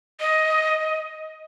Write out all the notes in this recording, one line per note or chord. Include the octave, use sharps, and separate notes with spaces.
D#5